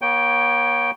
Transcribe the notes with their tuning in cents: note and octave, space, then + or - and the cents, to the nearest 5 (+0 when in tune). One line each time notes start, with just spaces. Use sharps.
A#3 +45 C#5 +0 G5 +0